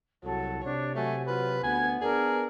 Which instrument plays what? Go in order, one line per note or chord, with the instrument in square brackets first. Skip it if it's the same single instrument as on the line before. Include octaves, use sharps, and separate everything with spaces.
[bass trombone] C2 [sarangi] F#3 [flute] A4
[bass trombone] C3 [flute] D4 [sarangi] C#5
[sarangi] F#3 [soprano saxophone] A3 [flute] G#5
[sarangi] F#3 [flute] F4 [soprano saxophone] B4
[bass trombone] D2 [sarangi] B3 [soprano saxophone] G#5 [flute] G#6
[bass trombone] B3 [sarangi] D4 [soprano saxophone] G#4 [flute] A#4